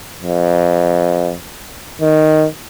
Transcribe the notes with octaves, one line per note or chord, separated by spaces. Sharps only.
F2
D#3